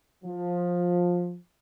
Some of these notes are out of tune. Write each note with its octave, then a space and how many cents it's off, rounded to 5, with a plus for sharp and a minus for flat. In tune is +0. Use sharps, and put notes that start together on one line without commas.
F3 +15